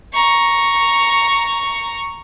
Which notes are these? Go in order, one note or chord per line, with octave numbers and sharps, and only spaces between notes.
A#5 C#6